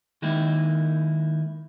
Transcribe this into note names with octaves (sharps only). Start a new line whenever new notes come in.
D#3 G#3 A#3 D#4 E4